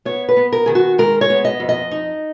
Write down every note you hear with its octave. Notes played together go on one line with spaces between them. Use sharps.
B3 C#5
B4
B3
A#4
D#3 G#4
F#4
G#3 A#4
C#5
B3
D#5
F2
D#5
D#4